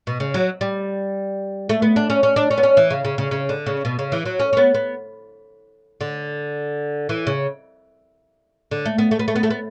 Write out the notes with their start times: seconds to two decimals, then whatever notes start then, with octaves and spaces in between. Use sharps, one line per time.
0.07 B2
0.20 C#3
0.34 F#3
0.61 G3
1.69 A3
1.82 B3
1.96 D4
2.10 C#4
2.23 C#4
2.36 D4
2.51 C#4
2.57 B3
2.63 C#4
2.77 E3
2.90 C#3
3.05 C#3
3.18 C#3
3.31 C#3
3.49 D3
3.66 C#3
3.85 B2
3.99 C#3
4.12 E3
4.26 F#3
4.40 C#4
4.53 C#4
4.57 B3
4.74 B3
6.01 D3
7.09 E3
7.27 C#3
8.71 D3
8.85 A3
8.98 B3
9.11 A3
9.19 B3
9.28 A3
9.36 B3
9.43 A3
9.50 B3